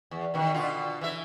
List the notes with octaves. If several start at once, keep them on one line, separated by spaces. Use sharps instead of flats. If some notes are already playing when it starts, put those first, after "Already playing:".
E2
B2 D#3
B2 D3 F4
E3 E5